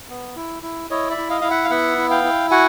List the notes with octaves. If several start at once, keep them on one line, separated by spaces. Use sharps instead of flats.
B3
E4
E4
E4 C#5 D#5
D5 E5
E4
D#5 F5
E4 F5
E5 F#5
F5
B3 E5 F#5
E4
F5 G5
E4
F#4 F#5 G#5